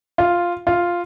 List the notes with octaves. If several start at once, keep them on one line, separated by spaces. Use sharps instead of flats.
F4
F4